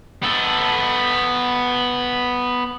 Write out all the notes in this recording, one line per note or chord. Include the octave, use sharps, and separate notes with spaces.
B3 A4